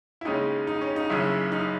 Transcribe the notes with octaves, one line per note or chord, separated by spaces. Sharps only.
E4
D#2 C#3 G#3 C#4 D#4
D#4
C#4
D#4
F#1 F#2 C#3 E4
D#4